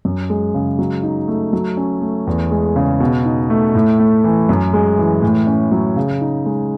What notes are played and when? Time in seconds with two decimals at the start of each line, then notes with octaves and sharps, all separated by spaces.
0.05 F#2
0.30 G#3
0.54 C#3
0.79 F#3
1.03 D#4
1.28 A3
1.53 F#3
1.77 C#4
2.02 A3
2.27 E2
2.51 G#3
2.76 C#3
3.00 B2
3.25 D#4
3.50 A3
3.75 A2
3.99 A3
4.24 E3
4.49 F#2
4.73 G#3
4.98 E3
5.22 A2
5.47 C#4
5.72 F#3
5.96 C#3
6.21 D#4
6.46 G#3